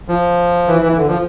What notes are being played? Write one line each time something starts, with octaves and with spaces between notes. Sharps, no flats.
F3
E3
E3
E3
D3
F3